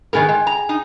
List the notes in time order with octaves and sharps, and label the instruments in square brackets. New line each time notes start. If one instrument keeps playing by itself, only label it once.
[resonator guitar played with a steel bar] D#3 B3 A#4 [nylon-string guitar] G#4 G5 G#5
[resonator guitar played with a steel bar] G#3
A#5
D#4